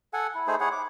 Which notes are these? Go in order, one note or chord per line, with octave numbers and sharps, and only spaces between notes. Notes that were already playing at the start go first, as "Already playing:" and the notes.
A4 F#5 G#5
E4
A3 D#4 G#4 C5
E4 G#4 C#5 F#5
D6